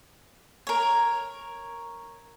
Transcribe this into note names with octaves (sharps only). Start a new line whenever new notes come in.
A#4 C#5